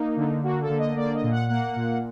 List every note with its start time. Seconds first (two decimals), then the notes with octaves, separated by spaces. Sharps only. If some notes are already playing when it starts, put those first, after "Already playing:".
Already playing: A#3 D#4
0.17 D3
0.43 A#3 F#4
0.61 A4
0.69 D3
0.79 D#5
0.96 A#3 D5
1.14 D#5
1.23 A#2
1.31 F#5
1.49 A#3 F#5
1.76 A#2